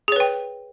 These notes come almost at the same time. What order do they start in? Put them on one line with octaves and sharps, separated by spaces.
G#4 C#5 B4 G5